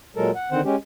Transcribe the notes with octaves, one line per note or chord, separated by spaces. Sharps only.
A#2 F#3 G#3 A4 A#4
F#5
D3 D#3 C4 C5 F#5
G#3 C#4 G4